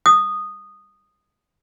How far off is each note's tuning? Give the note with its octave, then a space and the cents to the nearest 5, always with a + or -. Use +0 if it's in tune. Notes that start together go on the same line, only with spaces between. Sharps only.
D#6 -10